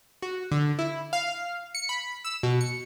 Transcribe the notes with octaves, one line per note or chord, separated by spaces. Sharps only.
F#4
D3
E4
F5
C#7
B5
E6
B2
C#7